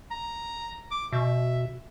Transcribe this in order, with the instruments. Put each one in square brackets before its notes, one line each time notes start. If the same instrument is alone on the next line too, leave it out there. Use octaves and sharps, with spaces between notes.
[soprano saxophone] A#5
D6
[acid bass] B2 [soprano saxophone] E5